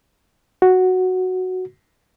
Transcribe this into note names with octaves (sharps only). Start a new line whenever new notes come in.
F#4